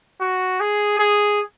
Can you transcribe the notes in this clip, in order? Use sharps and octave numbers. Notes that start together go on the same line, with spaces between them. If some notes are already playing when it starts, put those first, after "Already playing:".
F#4
G#4
G#4